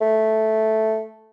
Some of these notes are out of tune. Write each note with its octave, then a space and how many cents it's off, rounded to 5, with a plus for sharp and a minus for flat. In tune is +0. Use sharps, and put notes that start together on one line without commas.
A3 -5